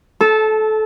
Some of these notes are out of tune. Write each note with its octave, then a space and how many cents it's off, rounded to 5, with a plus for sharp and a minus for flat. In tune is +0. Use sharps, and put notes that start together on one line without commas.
A4 -20 A5 +0